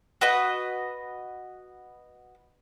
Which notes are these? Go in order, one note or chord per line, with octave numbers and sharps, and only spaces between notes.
F#4 B4 D#5